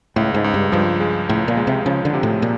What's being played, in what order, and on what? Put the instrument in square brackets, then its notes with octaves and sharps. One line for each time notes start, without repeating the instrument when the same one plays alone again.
[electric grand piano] C#2 [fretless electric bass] A2
[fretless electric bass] G#2
[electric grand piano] C#2
[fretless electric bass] G2
[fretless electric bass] G2 [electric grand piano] F3
[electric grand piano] G#3
[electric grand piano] C#2 [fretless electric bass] A2
[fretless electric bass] A#2
[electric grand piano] G#3
[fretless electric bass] C3
[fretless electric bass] C#3 [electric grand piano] F3
[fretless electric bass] D3
[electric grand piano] C3
[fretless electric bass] A2
A#2